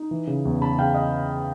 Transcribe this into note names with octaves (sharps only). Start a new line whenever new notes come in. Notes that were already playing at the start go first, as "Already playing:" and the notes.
Already playing: D#4
E3
C#3
E2
C#3 A5 B5
C#3 F5 G5
D#5 F5